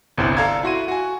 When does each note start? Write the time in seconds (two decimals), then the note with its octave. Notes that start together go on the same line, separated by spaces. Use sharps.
0.17 G1 C2 C4 E4
0.37 A4 D5 F5 A#5 G#6
0.63 E4 F#4 C6 D#7
0.88 F#4 G#5